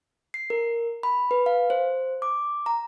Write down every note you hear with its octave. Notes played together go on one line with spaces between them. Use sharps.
C7
A#4
B5
B4
F5
C5
D6
A#5